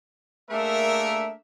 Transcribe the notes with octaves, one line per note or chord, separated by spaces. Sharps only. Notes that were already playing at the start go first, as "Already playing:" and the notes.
A3 A#3 D4 G#4 A#4 E5